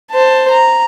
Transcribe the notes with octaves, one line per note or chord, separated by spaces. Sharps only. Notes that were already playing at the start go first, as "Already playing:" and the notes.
C5 A5
A#5